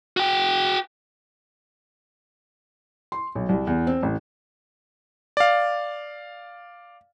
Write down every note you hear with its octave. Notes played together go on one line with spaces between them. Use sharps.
F#4 G5
C6
B1
C2
E2
C4
A1
D5 F5